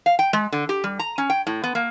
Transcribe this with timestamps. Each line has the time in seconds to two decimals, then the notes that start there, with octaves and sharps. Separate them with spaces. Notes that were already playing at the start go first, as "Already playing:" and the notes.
0.06 F5
0.19 G5
0.33 G#3
0.52 D3
0.69 G4
0.84 G3
0.99 A#5
1.18 C#4
1.30 G5
1.47 A2
1.64 B3
1.75 A#3